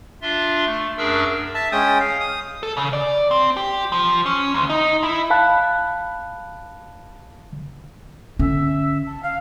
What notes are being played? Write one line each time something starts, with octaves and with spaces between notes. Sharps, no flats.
D4 F4 E5 C6
A3
F#2 D4 G#4 A#4 E5 E6
E5 A5
G#3 C#4 G5 D#6
F5
D#6
A4
C#3
D5
C4
G4
F3
C#4
D2
D#4
E4
F5 A5 B5 F#6
D3 C#4 E5
A5
F5